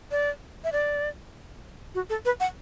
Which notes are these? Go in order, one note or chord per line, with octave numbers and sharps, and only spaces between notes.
D5
E5
D5
F#4
A4
B4
F#5